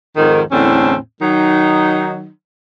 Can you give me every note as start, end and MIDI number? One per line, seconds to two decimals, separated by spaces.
0.16 0.42 41
0.16 0.42 44
0.16 0.42 51
0.51 0.95 40
0.51 0.95 45
0.51 0.95 50
0.51 0.95 60
0.51 0.95 61
1.21 2.28 51
1.21 2.28 54
1.21 2.28 63